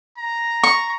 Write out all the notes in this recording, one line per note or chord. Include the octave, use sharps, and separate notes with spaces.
A#5
C#6